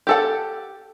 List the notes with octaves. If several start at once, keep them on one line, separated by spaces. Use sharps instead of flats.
G4 A4 F#5